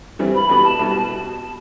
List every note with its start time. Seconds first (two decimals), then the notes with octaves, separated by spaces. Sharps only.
0.19 G2 E3 G3 C4
0.35 B5
0.49 C2 B2 G3 B3 B5
0.64 A5
0.79 C2 B2 G3 B3
1.09 B2